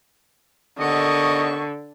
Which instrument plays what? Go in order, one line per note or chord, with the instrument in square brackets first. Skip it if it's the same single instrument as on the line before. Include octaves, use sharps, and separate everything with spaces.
[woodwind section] D#2 B3 C#6 [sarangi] D3 [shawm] D#5